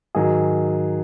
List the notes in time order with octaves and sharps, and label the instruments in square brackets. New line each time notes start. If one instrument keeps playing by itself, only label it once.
[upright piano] G#2 D#3 F#3 G#4